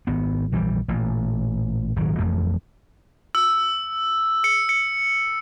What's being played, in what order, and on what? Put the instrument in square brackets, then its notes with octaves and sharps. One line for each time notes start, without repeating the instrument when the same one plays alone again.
[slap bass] G#1 B3
A#1 E3 F3 G3
A1 A#2
D#1 G#1 D#3 F#3
E1 A1 F2 A3
[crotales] E6
C#7
C#7